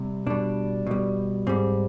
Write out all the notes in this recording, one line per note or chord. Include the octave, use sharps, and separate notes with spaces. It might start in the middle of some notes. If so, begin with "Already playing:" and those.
Already playing: C3 G3
B2 G3 D4
B2 G3
G#2 G3 C4